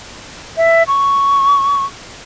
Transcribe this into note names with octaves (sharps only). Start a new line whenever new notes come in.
E5
C#6